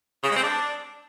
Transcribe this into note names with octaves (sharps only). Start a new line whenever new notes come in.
C#3
G#3
C4
D4